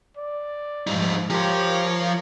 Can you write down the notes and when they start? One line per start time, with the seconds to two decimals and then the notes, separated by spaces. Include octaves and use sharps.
0.17 D5
0.87 G#2 F3 G3 D#4
1.30 F3 G4 A#4 C5 C#5